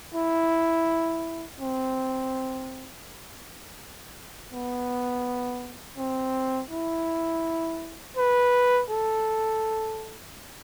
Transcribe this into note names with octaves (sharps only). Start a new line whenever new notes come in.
E4
C4
B3
C4
E4
B4
A4